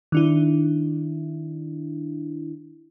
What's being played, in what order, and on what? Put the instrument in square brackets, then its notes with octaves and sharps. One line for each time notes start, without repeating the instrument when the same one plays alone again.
[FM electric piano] D#3 D4 E4